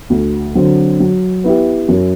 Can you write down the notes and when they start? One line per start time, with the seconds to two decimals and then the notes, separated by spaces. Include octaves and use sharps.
0.10 D2
0.55 D3 F#3 C4
1.00 F#3
1.44 B3 E4 G4
1.88 F#2